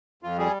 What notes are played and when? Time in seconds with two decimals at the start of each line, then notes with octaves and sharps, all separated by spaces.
0.23 F2 F4
0.38 G3 G#4